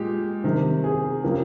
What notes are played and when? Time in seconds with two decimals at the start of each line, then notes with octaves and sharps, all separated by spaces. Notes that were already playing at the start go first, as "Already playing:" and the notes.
Already playing: A#2 G#3 G4
0.44 C3 D#3 G3
0.84 G#4
1.23 C#3 F3 A#3 G4